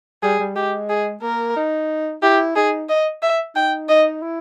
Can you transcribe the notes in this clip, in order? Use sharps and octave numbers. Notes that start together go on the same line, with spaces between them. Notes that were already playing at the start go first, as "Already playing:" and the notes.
G3 G#4
G3
G#3 G4
G#4
A#3 A#4
D#4
E4 G4
D#4 G#4
D#5
E5
D#4 G5
D#4 D#5
E4